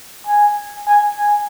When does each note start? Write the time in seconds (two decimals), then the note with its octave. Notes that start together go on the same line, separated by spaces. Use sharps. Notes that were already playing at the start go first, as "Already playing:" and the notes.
0.27 G#5
0.87 G#5
1.17 G#5